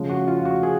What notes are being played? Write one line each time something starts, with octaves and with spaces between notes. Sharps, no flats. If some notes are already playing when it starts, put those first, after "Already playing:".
Already playing: C#3 F3 G#3
F#4
F4
F#4
G#4